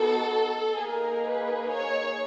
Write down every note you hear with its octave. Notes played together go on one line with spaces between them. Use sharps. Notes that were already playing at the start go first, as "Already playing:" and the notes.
Already playing: B3 D#4 F#4 A4
A#3 D#4 G#4 A#4
B4
C#5